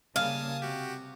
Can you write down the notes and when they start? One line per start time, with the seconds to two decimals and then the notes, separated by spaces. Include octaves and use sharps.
0.16 C#3 G3 A#3 F5 G#5 A5 D#6
0.62 C3 F#4 G4